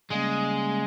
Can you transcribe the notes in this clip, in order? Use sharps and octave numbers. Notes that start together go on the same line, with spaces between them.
C#3 G3 G#3 A#3 C#4 G#4